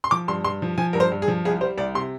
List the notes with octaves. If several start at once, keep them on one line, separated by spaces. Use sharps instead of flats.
C6
F3 D6
G2 C6
G2 C6
F3
F3 G#5
G2 A#4
C5
G2
G#4
F3
C2 G#4
G3 C5
C2 D5
C3 C6